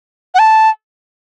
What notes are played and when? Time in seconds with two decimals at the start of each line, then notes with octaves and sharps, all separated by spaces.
0.34 F#5
0.39 A5